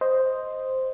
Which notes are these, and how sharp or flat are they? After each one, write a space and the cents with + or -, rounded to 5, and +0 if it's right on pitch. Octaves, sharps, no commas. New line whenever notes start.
C5 +0 D#5 +0